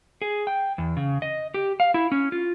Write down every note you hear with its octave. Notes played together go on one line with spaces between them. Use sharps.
G#4
G5
E2
C#3
D#5
G4
F5
E4
C#4
F4